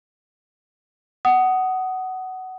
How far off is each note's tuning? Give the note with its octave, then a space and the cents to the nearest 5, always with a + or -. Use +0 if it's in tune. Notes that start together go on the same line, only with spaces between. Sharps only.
F#5 +15 D#6 +0